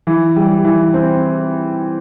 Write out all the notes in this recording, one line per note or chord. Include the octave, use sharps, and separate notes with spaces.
E3
G3
E3
C4